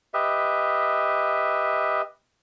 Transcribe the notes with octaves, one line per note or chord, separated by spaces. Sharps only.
G4 B4 D#5 E5